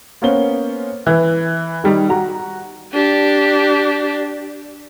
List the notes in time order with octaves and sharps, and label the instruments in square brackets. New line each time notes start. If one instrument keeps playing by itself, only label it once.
[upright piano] A#3 B3 C#4 C5 G7
E3
D#3 G3 D#4
F#4 A#5
[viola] D4 G4